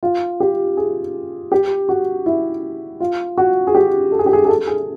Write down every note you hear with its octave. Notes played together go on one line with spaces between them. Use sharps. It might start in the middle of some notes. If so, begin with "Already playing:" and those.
F4
G4
G#4
G4
F#4
E4
F4
F#4
G#4
G4
A4
G#4
G4
G#4
G#4
A4
G#4